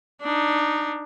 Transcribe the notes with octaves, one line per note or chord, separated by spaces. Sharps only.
D4 D#4